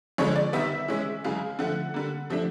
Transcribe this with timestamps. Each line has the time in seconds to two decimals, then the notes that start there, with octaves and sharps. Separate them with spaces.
0.18 F2 D3 F3 G#3 C#5
0.36 D5
0.53 C3 D#3 G3 B3 E5
0.88 C3 E3 G#3 C#4
1.24 F#2 C#3 E3 G#3 F5
1.59 D3 F3 A3 F#5
1.94 D3 G3 A#3
2.30 C3 F3 A3 D4